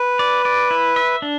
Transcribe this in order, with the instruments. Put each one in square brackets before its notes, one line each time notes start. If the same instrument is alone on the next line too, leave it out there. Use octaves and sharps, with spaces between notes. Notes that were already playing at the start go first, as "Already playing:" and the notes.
Already playing: [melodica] B4
[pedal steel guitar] D5
D5
E4
E5
D4